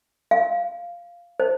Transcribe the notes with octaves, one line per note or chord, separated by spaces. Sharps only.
F5
C5